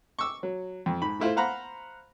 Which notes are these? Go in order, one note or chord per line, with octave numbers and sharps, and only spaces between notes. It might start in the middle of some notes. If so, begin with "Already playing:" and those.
C#6 D6 E6
F#3
F2
G#2 B5
A2 A3 E4 F4 C5
C5 F5 F#5 A#5 B5